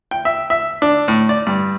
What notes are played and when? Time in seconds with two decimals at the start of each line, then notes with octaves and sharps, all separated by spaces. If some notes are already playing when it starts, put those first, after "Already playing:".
0.11 G5
0.25 E5
0.50 E5
0.82 D4
1.08 A2
1.29 D5
1.47 G2